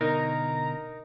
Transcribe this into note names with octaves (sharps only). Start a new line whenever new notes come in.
B2 D3 D#4 A#4 A#5